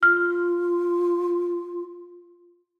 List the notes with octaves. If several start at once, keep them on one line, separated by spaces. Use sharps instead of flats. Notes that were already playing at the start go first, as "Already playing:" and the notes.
F4 F6